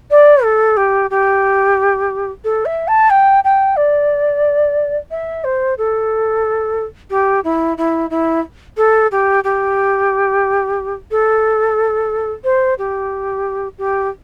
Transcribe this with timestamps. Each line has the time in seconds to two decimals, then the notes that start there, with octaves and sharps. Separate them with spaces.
0.11 D5
0.43 A4
0.77 G4
1.10 G4
2.44 A4
2.65 E5
2.88 A5
3.10 G5
3.44 G5
3.76 D5
5.11 E5
5.44 C5
5.78 A4
7.10 G4
7.44 E4
7.77 E4
8.10 E4
8.77 A4
9.11 G4
9.44 G4
11.11 A4
12.44 C5
12.78 G4
13.78 G4